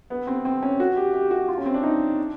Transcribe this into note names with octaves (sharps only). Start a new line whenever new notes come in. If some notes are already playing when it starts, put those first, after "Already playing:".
B3
C4
C4
C#4
F#4
G4
G4
F#4
F4
C#4
C4
D4
D#4
D4